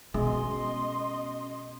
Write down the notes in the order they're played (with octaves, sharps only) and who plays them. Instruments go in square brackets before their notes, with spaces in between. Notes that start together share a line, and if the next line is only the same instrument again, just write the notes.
[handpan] B2 [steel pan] G#3 [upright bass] C#4 [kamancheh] D#5 C6